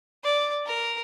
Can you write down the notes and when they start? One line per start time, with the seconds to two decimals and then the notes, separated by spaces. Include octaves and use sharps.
0.24 D5
0.66 A#4